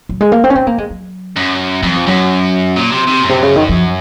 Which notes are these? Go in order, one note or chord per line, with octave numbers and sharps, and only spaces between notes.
F#3
G#3
A#3
C4
C#4
C4
A#3
G#3
F#3
F#2
F2 F#3
F3
F#2 F#3
A#2
C3
C3
A#2
F#2
C3
C#3
D#3
F3